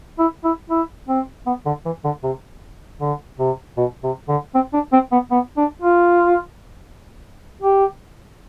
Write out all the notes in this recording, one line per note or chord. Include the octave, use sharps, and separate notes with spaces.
E4
E4
E4
C4
B3
D3
E3
D3
C3
D3
C3
B2
C3
D3
C4
D4
C4
B3
B3
D4
F4
G4